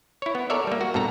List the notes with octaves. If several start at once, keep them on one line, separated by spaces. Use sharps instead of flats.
E4 C#5
B3
A4 A#4 C#5 D5 E5
G3 A#3
F#4
G2 B2 A4 A#5